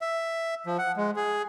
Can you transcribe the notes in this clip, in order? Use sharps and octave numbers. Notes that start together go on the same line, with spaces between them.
E5
F3
F#5
G#3
G#4